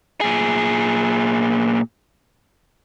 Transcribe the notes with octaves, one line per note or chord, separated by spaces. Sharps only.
A#2 G#4